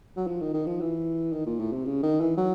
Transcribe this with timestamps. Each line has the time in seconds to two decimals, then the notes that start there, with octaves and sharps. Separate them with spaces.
0.16 F#3
0.27 F3
0.41 D#3
0.54 D#3
0.66 F3
0.80 E3
1.33 D#3
1.46 A#2
1.59 A2
1.73 C3
1.85 C#3
2.03 D#3
2.20 E3
2.37 F#3